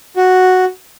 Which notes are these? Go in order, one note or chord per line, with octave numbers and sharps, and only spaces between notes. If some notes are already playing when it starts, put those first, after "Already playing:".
F#4